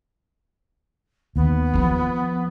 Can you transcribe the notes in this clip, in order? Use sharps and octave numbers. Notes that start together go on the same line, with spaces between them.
D#2 B3
F2 F3